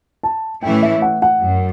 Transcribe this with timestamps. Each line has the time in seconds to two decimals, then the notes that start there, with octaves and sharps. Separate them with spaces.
0.23 A5
0.62 A2 E3 A3 C#4 E4 G5
0.82 E5
1.02 F#5
1.22 F#5
1.42 F#2